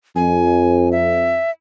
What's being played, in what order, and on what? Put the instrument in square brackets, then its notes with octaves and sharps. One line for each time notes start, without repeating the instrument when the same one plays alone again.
[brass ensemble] F2 [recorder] G#5
[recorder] E5